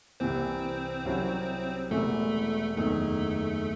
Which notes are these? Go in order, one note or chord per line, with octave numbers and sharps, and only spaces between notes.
C2 C3 E3 C4 C5
C2 C3 F#3 C#4 E4
E1 E2 C3 E3 A3 A4
F#1 E2 D#3 A3 A4